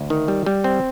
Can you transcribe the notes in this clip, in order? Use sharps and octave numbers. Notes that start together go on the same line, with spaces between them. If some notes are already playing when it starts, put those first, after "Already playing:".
Already playing: D2
D#3
G3
G3
C4